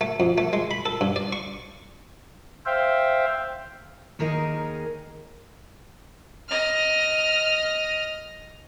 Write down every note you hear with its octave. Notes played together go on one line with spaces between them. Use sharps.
A3
F2
A3
G#3
B5
A4
G2
D5
C#6
C5 E5 F5 G5
D#2 D#3 G#4 A#4 D#5
D#5 F6